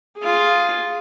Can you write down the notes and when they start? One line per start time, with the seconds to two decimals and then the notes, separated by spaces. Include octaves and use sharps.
0.18 F4 G#4